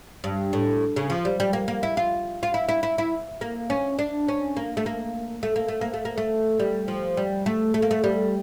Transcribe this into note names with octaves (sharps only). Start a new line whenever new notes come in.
G2
A2
C#3
F3
G3
G3
A#3
A#3
E4
F4
F4
E4
E4
E4
E4
A#3
C#4
D4
C#4
A#3
A3
A#3
A3
A#3
A3
A#3
A3
A#3
A3
G3
F3
G3
A3
A3
A#3
A3
G3